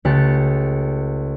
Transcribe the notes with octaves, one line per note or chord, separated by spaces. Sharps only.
C#2 A3 G4 F#6 A6 C#7